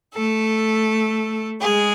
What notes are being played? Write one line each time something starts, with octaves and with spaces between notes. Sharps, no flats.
A3 A4
G#3 G#4